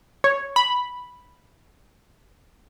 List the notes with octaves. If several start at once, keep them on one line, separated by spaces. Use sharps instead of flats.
C#5
B5